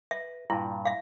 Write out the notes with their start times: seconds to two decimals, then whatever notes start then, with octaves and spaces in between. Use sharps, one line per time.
0.11 B4 E5
0.50 G2 A#2 E4
0.85 E5 F5